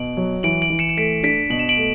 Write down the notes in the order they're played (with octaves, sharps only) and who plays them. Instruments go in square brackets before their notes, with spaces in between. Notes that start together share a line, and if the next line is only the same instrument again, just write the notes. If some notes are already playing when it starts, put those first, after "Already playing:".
Already playing: [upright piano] B2 [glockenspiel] D7 F#7
[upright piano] F#3
[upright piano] E3 [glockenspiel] D7 F#7
[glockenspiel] D7 F#7
[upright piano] E3
[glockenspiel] C#7 E7
E7
[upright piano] A3 [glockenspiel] B6 D7
[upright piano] D4 [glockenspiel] B6 D7
[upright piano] B2 [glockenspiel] F#7
[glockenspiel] E7
D7 F#7
[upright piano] A3